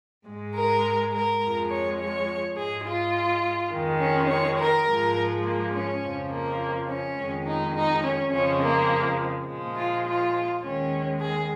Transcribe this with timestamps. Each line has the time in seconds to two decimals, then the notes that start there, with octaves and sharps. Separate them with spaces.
0.26 G#2 G#3
0.55 A#4
1.12 A#4
1.41 F2 F3 G#3
1.70 C#5
1.99 C#5
2.56 G#2 G#3 G#4
2.85 F4
3.72 F2 D#3 G#3
4.00 C#4
4.29 C#5
4.58 A#4
4.87 G#2 F3 G#3
5.44 A#3
5.73 C#4
6.02 F2 C#3 F3
6.31 A#3
6.89 C#4
7.17 F2 D#3 G#3
7.46 D#4
7.75 D#4
8.03 C#4
8.32 F2 C#3 F3 G#3 C#4
8.61 A#3
9.48 A#2 F3 G#3
9.76 F4
10.06 F4
10.62 D#2 D#3 G#3 C#4
11.20 G#4